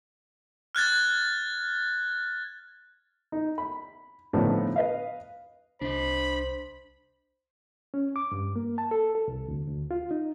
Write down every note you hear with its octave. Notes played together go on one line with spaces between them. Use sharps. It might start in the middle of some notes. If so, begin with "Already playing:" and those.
F6 F#6 G#6 A6
D#4
B5
A2 D3 F3 B3 D4 D#4
B4 D#5 F5
C2 D4 C5 D#5 B5
C#4
D6
G2
A#3
A5
A4
A4
C2
D2
D2
F4
D#4